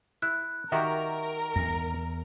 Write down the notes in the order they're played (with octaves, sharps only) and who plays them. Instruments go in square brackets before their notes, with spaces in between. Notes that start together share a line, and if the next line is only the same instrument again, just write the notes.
[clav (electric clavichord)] E4 [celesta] F#6
[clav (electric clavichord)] D#3 F#4 G4 [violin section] A#4 [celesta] E5 C#6
[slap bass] E2 [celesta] A#6